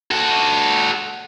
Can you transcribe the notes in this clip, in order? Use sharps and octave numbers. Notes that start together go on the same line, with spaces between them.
F#4 A4